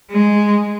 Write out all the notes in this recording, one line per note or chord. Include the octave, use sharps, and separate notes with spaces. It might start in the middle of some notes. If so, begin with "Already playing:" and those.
G#3